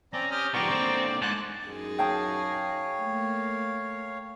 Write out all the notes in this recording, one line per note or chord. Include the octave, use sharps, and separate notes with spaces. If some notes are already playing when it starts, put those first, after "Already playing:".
C4 C#4 D5 A#5
G4 D#6 F6
G#2 F3 B3 G4 D5 A#5 C6 C#6
D3 A#3 C4
G#2 C5 A5 F#6
F#2 D#4 G#4
C#5 F5 G5 A5 D#6
A3 A#3